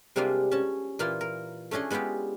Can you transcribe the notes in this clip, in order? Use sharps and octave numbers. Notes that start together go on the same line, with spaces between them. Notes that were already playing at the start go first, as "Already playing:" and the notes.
C3 G3 G#3 A#3 D4 F4
C#4 A5
A#2 E3 A#3 F4 C6
A#4
A3 C#4 D4 G#4 D#5
G#3 B3 E4 F4 G4